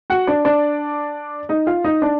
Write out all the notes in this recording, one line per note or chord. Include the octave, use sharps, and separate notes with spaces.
F#4 F#5
D4 D5
D4 D5
D#4 D#5
F4 F5
D#4 D#5
D4 D5